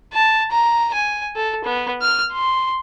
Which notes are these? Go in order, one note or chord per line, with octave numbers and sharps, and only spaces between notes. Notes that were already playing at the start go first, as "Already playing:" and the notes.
A5
A#5
G#5
A4
B3
F6
C6